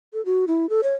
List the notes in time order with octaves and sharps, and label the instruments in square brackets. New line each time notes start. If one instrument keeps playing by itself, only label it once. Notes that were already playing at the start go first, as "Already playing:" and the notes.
[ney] A4
F#4
E4
A4
C#5